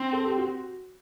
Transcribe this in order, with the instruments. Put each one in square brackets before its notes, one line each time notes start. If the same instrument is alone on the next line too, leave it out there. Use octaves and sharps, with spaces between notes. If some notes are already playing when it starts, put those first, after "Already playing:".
Already playing: [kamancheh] C4
[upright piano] A4
G4
F#4